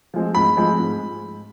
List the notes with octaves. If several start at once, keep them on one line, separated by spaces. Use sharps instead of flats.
F3 G#3 C4
G#2 B5
F3 G#3 C4
G#2